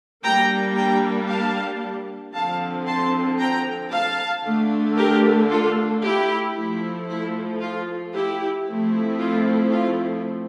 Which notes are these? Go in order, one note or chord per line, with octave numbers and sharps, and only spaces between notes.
G3 A#3 D4 G5 A#5
G5 A#5
F5 A5
D3 F3 C4 F5 A5
A5 C6
G5 A#5
F5 A5
D3 A3 D4
G4 A#4
F4 A4
E4 G4
F3 A3 E4
E4
F4
E4 G4
F3 A3 C4 E4
F4
F4